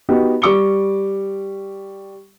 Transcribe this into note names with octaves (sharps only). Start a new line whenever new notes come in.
B3 D#4 F#4 G4
G3 C#6 D6 C#7 G7